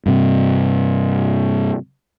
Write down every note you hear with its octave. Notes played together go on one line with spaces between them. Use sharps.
G2 C3